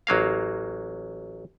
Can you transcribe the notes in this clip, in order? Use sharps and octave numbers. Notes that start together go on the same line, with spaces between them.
A1 F#3 A#3 F5